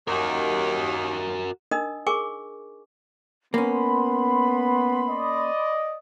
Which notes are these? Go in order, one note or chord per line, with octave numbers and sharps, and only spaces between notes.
D#2 D#3 F#4 A#4
D4 D#4 A#4 D#5 D#6
G#4 A#4 G#5 C#6 D6
A#3 B3 C#4 B5 C6
D5 D#5